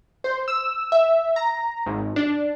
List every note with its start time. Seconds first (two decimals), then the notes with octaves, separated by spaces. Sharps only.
0.24 C5
0.48 E6
0.92 E5
1.36 A#5
1.86 G#1
2.16 D4